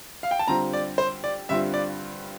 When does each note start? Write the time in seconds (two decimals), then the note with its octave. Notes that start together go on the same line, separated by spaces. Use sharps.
0.23 F5
0.31 G5
0.39 A5
0.48 D3 G3 C4 F4 A#5
0.73 D5
0.98 C5
1.24 D5
1.49 G2 D3 G3 C4 F4 E5
1.74 D5